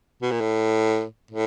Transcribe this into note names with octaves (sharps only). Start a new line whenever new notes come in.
B2
A#2
A2
A2